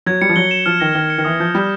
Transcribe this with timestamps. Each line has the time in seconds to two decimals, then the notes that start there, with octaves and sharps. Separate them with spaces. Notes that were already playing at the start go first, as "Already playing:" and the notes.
0.06 F#3 G#6
0.21 G3 C#7
0.29 F3
0.36 F#3 G7
0.51 E7
0.66 F3 F6
0.80 D#3 A#6
0.95 D#3 F6
1.10 C#7
1.18 D#3
1.25 E3 D#6
1.40 F3 G6
1.55 G3 D#6